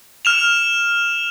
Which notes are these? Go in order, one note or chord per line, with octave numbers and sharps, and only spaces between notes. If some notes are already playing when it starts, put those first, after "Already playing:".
F6 E7 F7